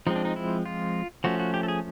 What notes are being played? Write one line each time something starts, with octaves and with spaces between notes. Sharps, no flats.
F3 G#3 C4 D#4
D4
D#4
E4
F4
F3 A3 C#4 F#4
F#4
G4
A4
G#4